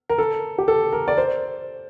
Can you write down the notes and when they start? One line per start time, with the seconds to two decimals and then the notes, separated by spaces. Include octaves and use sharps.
0.10 A#4
0.18 A4
0.58 G4
0.68 A4
0.93 A#4
1.08 D5
1.18 C5